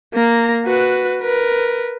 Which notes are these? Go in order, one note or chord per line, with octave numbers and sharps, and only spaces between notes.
A#3 A#5
F#4 B4
A#4 B4